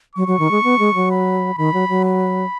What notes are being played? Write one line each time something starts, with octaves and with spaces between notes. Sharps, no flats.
F#3 C#6
F#3
D#3
G#3
B3
G#3
F#3
B5
D#3 B5
F#3
F#3
B5